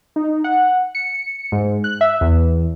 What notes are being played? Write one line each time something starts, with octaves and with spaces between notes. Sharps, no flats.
D#4
F#5
C#7
G#2
F#6
E5
E2